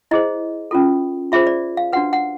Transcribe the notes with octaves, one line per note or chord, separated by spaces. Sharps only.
E4 G#4 C5 D#5
C#4 F4 A4
F4 G#4 C5 E5
D5
F5
D4 F#4 B4 F#5
F#5